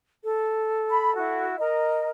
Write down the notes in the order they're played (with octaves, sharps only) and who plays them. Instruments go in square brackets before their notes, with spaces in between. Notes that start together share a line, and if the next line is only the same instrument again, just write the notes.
[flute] A4
[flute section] B5
E4 F#4
[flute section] A#4 [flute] D#5